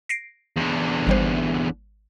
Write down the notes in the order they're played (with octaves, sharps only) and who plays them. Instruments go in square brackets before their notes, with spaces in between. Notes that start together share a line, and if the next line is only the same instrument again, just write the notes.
[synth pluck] A#6 C7 D7
[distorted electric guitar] E2 D3
[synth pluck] G#1 G3 C5